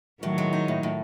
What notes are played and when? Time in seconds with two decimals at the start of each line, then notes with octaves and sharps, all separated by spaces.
0.23 A2 D#3 F#3
0.38 G#3
0.53 D#4
0.68 A2
0.83 A2